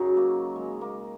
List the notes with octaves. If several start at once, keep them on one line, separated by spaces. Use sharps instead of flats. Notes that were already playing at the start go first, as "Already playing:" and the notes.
Already playing: F#2 C#3 F#3 D#4
A#3
G#3
A#3